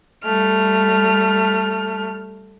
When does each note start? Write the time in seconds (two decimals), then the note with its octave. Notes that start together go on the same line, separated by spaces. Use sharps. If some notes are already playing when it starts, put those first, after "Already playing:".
0.23 G3 A3 F6